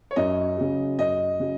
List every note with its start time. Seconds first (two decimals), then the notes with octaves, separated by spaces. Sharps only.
0.11 C#5
0.16 F#2 D#5
0.57 C#3 F#3
0.99 F#2 D#5
1.40 C#3 F#3